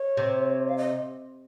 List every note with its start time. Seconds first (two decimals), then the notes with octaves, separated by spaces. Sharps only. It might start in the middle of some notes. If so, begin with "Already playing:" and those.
Already playing: C#5
0.17 C3
0.68 F5
0.78 D#5